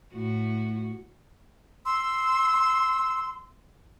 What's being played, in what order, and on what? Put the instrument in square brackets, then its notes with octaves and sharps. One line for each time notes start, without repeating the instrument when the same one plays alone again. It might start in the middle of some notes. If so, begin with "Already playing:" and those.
[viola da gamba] A2 F#4
[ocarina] C6 [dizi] E6